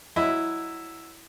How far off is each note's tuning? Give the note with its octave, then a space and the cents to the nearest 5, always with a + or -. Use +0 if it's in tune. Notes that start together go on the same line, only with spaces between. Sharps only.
F#3 +0 E4 +0 D#5 +0